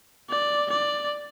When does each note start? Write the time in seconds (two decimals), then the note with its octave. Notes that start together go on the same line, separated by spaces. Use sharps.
0.29 D5
0.70 D5